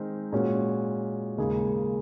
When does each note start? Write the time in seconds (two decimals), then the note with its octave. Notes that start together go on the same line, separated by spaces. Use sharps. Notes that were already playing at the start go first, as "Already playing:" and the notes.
Already playing: D#3 G#3 C4 D#4
0.32 A#2 G#3 C#4 F#4
1.38 D#2 C#3 G#3 D#4 G#4